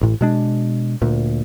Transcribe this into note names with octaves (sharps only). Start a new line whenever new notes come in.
A1 A2
B2 G#3 D4
D2 A#2